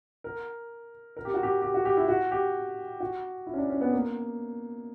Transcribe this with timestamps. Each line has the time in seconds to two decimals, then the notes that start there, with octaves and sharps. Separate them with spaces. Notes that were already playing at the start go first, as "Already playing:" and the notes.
0.24 A#4
1.17 A#4
1.25 G4
1.34 F#4
1.43 G4
1.62 G4
1.74 F#4
1.85 G4
1.97 E4
2.08 F#4
2.32 G4
3.00 F#4
3.47 E4
3.54 C#4
3.58 D4
3.70 C#4
3.81 B3
3.93 A#3